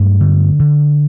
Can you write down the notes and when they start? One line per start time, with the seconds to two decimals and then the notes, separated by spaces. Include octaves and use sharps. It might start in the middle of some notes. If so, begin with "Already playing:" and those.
Already playing: G2 F#3 A3
0.20 D3
0.59 D3